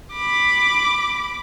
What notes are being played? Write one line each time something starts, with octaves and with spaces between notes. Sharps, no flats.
B5 D6